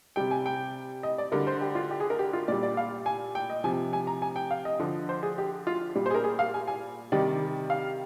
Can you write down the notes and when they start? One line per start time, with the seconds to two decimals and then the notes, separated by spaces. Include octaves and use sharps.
0.16 C3 G3 G5
0.31 G#5
0.46 G5
1.03 D#5
1.18 D5
1.32 D3 G3 A#4
1.47 C5
1.61 G4
1.75 F4
1.91 G4
2.00 G#4
2.10 A#4
2.19 G4
2.33 F4
2.48 A#2 G3 D5
2.63 D5
2.77 F5
3.06 G#5
3.35 G5
3.50 D#5
3.64 C3 F3 G#5
3.93 G#5
4.07 A#5
4.22 G#5
4.36 G5
4.51 F5
4.65 D#5
4.79 D3 F3
5.09 C5
5.23 G#4
5.38 G4
5.67 F4
5.95 A#2 G3
6.06 C5
6.10 G#4
6.15 A#4
6.24 G#4
6.39 F5
6.54 G#5
6.68 G#5
7.12 C3 D#3 G3 D5
7.70 F5